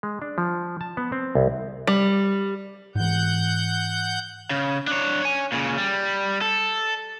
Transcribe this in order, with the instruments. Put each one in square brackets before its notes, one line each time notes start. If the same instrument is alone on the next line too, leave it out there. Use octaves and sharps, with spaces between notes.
[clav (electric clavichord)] G#3
D4
F3
A5
B3
C4
C2
[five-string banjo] G3
[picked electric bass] G#2 E3 [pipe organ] F#5 G6
[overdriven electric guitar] C#3
D4 C#5
C#5 G#5
A#2 C#3
G3
A4